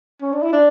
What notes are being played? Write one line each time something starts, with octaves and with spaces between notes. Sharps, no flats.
C#4
D4
E4
D4